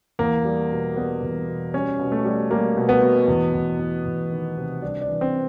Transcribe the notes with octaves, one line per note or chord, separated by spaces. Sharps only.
E2 A#3
G3
B2
G3 B3
E2
B2
G3 C#4
B2
A3
G3
G3 A#3
B2
B3
B2
E2
E2
E2
E2
D#3
C3
G3 D4
D4
E3
C4